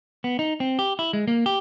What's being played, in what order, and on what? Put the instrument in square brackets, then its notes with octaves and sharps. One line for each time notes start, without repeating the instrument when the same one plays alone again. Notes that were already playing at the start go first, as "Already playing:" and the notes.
[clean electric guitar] B3
D#4
C4
G4
E4
G#3
A#3
G4